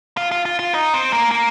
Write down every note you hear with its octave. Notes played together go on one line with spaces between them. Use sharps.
F4
F4
F4
F4
D#4
C4
A#3
A#3